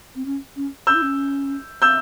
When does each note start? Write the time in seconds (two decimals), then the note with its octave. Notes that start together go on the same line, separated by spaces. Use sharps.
0.15 C4
0.25 C#4
0.55 C#4
0.87 C#4 E6 G6
0.94 E4
1.01 C#4
1.82 E6 G6